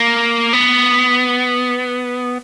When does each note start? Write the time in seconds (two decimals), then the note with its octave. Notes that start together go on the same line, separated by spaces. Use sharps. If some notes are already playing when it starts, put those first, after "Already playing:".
Already playing: A#3
0.53 B3